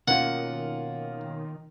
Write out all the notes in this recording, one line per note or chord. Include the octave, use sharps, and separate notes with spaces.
B2 D#3 A#3 C#4 F4 F#5